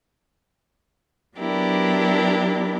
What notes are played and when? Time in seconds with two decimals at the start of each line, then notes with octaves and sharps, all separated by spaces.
1.37 F#3 B3 D4 E4 G4 A#4